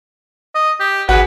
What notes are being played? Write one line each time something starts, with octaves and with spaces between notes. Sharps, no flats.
D#5
G4
A1 F#4 G#4 B4